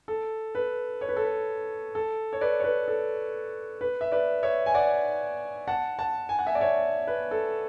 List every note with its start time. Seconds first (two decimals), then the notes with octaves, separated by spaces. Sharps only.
0.08 A4
0.55 B4
1.01 C#5
1.09 B4
1.17 A4
1.24 B4
1.95 A4
2.33 C#5
2.41 B4 D5
2.60 C#5
2.64 B4
2.88 A4
3.81 B4
4.01 E5
4.12 B4 D5
4.43 C#5 E5
4.66 G#5
4.74 D5 F#5
5.68 F#5 A5
5.99 F#5 A5
6.29 G#5
6.39 F#5
6.47 E5 G#5
6.55 D5
6.61 C#5 E5
7.08 B4
7.31 A4